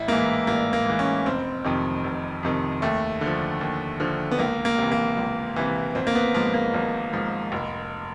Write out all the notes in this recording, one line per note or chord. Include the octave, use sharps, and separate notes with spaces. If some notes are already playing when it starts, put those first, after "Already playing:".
Already playing: A1 E4
G#2 E3 A#3
A1 A#3
A#3
G#2 E3
C#4
F1 C4
F2 C3 D#3
F1
F2 C3 D#3
D#2 A3
D3 F3
D#2
D3 F3
B3
C#2 A#3
A#3
C3 E3
A#3
C#2
C3 E3
G#1 C4
A#3
B3
G#2 F3 A#3
A#3
G#1
G#2 F3
F1